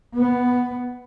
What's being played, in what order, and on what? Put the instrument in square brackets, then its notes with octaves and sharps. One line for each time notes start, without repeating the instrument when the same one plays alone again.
[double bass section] B3